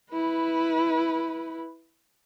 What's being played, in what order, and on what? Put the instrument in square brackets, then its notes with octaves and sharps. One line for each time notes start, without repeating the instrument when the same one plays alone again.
[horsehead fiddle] E4 B4